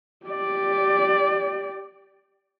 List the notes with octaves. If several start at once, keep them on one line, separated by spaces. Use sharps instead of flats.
G4 D5